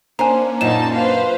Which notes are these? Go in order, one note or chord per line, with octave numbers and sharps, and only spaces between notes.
A#3 C#4 D4 C5 G#5 A#5
F#2 A#2 D#4 C5 A5 E7
B4 C5 F5